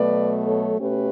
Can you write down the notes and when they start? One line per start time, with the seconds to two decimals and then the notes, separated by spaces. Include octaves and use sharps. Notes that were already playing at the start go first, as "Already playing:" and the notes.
Already playing: B2 F#3 A3 B4 D5
0.43 A4 C#5
0.80 B2 A3 C#4 G4 B4